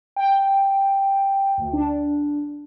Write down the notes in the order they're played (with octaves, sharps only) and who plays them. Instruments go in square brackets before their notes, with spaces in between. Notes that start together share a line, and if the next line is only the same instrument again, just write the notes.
[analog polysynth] G5
D2
D4